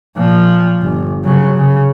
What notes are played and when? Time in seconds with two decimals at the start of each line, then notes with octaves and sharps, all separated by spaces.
0.17 A#2 F3
0.82 G1
1.24 C#3 F#3
1.56 C#3